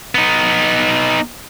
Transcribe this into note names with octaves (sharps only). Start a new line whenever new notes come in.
B3 D#4